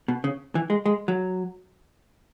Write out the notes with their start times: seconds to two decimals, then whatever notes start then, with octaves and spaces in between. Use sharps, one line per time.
0.08 B2
0.24 C#3
0.55 E3
0.70 G#3
0.86 G#3
1.08 F#3